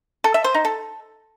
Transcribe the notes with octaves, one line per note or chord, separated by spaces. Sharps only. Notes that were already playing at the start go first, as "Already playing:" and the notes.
A4
E5
C5
D#4
A4